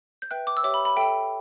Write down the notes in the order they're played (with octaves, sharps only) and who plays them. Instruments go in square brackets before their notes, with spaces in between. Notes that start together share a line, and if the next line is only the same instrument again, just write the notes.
[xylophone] G6
B4 E5 G5 F#6
D6
E6
G4 C#5 E5 G5 D6
B5
B5
A4 E5 G5